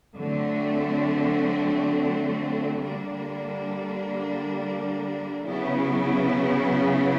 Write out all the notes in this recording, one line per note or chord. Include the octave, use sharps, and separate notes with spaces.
D3 F#3 A3 C4
D3 G3 A#3 D4
C#3 F#3 B3 E4